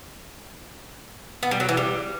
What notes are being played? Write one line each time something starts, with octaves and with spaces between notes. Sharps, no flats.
B3
G3
F#3
E3
G3